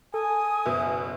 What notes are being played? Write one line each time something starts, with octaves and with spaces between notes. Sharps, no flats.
A4 G#5 D#6
F#1 B2 E5